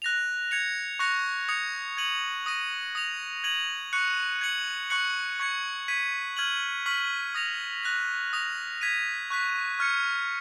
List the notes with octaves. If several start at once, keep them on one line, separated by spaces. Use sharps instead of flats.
F#6 A#6 F7
G#6 C#7 F7
C#6 F#6 A#6 C#7 F7
D#6 G#6 C#7 F7
G#6 D#7 F#7
D#6 A#6 D#7
D#6 A#6 F7
G#6 D#7 F#7
C#6 F#6 C#7
G#6 C#7 F#7
C#6 F#6 C#7 F#7
C#6 G#6 C#7
G#6 B6 D#7
F6 G#6 D#7 F#7
C#6 F6 B6 F#7
D#6 A#6 F7
F#6 A#6 F7
D#6 A#6 F7
G#6 B6 D#7
C#6 F#6 B6
C#6 F6 G#6 C#7